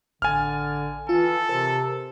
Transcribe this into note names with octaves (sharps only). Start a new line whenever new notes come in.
A1 D3 G#5 F6 A6
E3 F4 A4
C3 A#4 C5